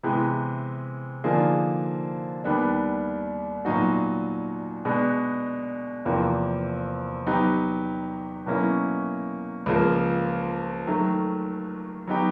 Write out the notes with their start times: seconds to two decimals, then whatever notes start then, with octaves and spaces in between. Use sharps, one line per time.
0.03 C3 E3 G#3 B3
1.24 D3 F3 A#3 D#4 G#4
2.44 D#2 D#3 G3 B3 D4
3.65 A#2 F#3 B3 D#4 F#4
4.85 B2 G#3 B3 D4
6.05 E2 C3 F3 A#3
7.26 F#3 B3 D#4 G4
8.46 B2 F#3 A#3 C#4 E4
9.66 C#2 C#3 F3 A#3
10.87 D#3 F#3 A3
12.07 F#3 B3 D#4 G4